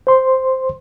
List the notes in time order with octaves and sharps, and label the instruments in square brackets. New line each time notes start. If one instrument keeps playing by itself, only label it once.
[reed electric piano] C5 C6